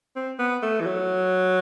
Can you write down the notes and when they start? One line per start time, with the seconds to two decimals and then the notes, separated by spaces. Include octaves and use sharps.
0.16 C4
0.39 B3
0.63 A3
0.80 E3
0.86 F#3